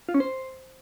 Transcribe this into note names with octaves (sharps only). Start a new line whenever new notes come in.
F4
C#4
C5